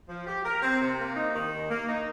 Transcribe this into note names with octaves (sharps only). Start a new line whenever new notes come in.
F3
G4
A#4
C4
C3
A#3
D#4
D#3
D#2
A#3
D#4